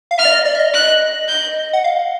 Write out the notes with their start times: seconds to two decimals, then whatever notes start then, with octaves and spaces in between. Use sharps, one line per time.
0.11 F5
0.18 E5 F6
0.25 D5
0.32 D#5
0.46 D5
0.55 E5
0.59 D#5
0.73 F#6
1.29 G6
1.73 F#5
1.84 F5